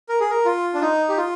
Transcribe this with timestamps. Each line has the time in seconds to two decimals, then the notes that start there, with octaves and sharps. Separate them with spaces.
0.09 A#4
0.20 G#4
0.30 A#4
0.45 F4
0.74 D4
0.81 D#4
1.09 G4
1.17 F4